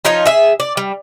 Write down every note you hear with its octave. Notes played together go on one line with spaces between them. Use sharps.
F3 D#4 F4 C#5
G#4 E5
D5
G3